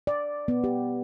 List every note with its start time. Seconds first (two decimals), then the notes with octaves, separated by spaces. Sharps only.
0.07 D5
0.48 B3
0.64 G4